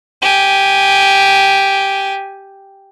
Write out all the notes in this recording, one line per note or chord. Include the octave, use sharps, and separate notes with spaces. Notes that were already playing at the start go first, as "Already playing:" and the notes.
G4 G#5